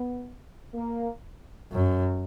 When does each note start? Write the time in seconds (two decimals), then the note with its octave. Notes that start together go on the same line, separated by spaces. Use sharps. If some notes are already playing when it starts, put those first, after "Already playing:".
Already playing: B3
0.74 A#3
1.72 F#2